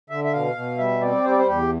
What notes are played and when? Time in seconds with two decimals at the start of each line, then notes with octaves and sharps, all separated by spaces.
0.10 D3 E5
0.24 E5
0.33 B2 F5
0.55 B2
0.78 G3 E5
1.01 C4 D5
1.24 G3 C5
1.31 D5
1.38 C5
1.47 E2 G4